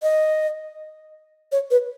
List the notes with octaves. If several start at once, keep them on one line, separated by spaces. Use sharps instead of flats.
D#5
C#5
B4